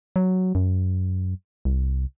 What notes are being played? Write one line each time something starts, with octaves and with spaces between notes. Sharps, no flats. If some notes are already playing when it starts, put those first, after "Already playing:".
F#3
F#2
C2